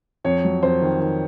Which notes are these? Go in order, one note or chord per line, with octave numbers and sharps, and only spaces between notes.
F2 C#5
F#3
F2 C5
D#3
D#3